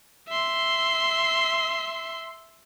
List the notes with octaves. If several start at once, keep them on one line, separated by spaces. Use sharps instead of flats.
E5 C6